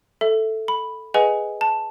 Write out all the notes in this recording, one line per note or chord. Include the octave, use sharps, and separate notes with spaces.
A4 E5
B5
G#4 B4 D#5 F#5 G#5
A5